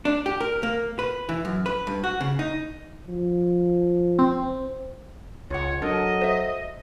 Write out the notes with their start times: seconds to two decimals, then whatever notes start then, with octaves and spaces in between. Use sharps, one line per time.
0.05 D4
0.26 G4
0.40 A#4
0.63 A#3
0.99 B4
1.29 E3
1.45 F#2
1.66 B4
1.87 G2
2.04 F#4
2.21 C#3
2.39 D#4
3.08 F3
4.19 C4
5.50 C#2 F4 C#5 F#5
5.82 F#3 D4 A4 A#4 D#5
6.21 C5 E5